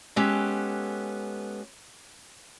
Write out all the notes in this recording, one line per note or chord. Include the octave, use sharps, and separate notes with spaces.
G#3 B3 C#4 G4 A4